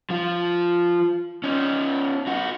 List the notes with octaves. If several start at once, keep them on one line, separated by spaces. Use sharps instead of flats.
F3 F4
C#4 D#4
D#4 F#4